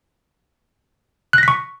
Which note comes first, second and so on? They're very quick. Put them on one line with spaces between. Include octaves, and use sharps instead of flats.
F#6 A#6 B6 C#6